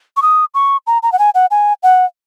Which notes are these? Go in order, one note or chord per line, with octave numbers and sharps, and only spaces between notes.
C#6
D#6
C#6
A#5
A#5
F#5
G#5
F#5
G#5
F#5